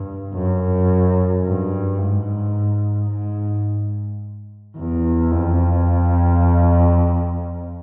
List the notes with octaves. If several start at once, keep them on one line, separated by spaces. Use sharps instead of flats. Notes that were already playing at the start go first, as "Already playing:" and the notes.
Already playing: G2
F#2
G2
G#2
G#2
E2
F2